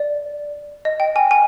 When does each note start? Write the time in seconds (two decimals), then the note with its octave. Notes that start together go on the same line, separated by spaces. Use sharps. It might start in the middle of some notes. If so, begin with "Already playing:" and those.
Already playing: D5
0.85 D#5
1.00 G5
1.16 G#5
1.31 G#5